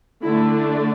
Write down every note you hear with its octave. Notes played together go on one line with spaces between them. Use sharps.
D3 A3 D4 E4